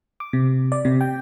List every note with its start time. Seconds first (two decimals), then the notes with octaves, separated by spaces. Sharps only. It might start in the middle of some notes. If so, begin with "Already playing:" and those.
0.20 D6
0.33 C3
0.72 D5
0.85 C3
1.01 G5